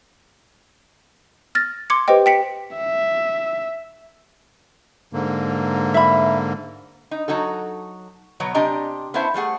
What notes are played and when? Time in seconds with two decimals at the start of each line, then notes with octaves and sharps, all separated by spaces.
1.55 F6 A6 A#6
1.90 C6 D6 G#6 C#7
2.08 G4 B4 C5 D#5 G5
2.26 G5 B6 C#7
2.77 E5
5.13 G#2 D3 A#3
5.94 E5 B5
7.11 D#4
7.28 F#3 D#4 F#4 A4
8.40 B2 F#3 B3 C#5
8.54 C3 D4 G4 D#5 G#5 A#5
9.14 B3 C#4 E4 C5 E5 A5
9.34 G3 A3 G#4 F#5